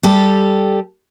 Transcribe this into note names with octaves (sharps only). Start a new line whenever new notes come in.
G3 G4 A4